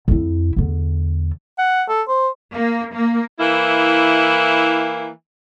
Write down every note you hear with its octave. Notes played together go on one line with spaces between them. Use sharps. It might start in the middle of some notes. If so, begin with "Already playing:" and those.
F2 E4
E2 D3
F#5
A4
C5
A#3
A#3
E3 A#3 E4